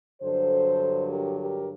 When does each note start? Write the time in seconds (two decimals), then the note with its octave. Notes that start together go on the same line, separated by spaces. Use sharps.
0.22 G2 D3 F#3 A4 C5
1.09 G4 A#4
1.38 G4 A#4